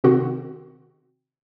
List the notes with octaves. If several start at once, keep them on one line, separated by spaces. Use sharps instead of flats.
C3 D#3 C4 F#4